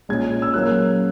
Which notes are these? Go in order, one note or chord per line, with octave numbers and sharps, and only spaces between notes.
A#2 G#3 C#4 G#6
E6
F#3 A#3 C#4 E4 F#6